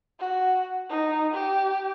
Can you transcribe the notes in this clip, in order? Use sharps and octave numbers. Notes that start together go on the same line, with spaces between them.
F#4
D#4
G4